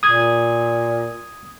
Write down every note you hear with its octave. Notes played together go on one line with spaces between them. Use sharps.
A#2 D#6 G#6